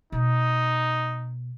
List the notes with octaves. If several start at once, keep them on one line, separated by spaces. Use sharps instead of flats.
B2 D#4